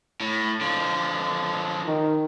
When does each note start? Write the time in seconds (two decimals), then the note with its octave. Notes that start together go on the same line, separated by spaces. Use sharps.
0.20 A2
0.61 D3 F3
1.87 D#3